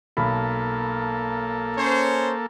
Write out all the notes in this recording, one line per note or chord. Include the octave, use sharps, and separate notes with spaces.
B1 A#3 A4 B5
C#4 C5 C#5